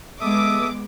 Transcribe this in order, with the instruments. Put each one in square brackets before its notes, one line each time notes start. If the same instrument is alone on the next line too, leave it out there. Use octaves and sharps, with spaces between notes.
[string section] G#3 B3 D6 [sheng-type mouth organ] A4 E5 D#6